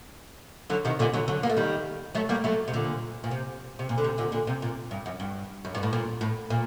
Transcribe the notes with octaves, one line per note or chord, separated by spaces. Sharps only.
D3 F#3
C3 D#3
A#2 D3
D3 F#3
D3 F#3
A#3
A3
D#3 G3
F#3 A3
G3 A#3
F#3 A3
C3
A#2 D3
A#2
C3
C3
A#2
D3
C3
A#2 D3
A#2 D3
C3
A#2
G2
F#2
G2
F#2
G2
A2
A#2
A2
A#2